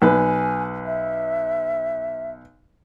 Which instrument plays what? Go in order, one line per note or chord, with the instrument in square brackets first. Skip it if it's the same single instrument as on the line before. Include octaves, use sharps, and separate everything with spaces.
[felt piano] B1 B4 [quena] G#5
[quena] E5